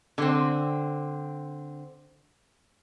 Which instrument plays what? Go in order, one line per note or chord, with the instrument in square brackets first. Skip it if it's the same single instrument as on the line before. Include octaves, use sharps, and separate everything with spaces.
[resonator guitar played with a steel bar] D3 C4